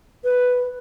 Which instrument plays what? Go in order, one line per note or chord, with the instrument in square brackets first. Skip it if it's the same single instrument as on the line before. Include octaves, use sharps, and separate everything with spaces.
[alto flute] B4